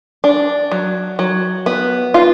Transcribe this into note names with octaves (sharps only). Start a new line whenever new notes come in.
D4
F#3
F#3
B3
F4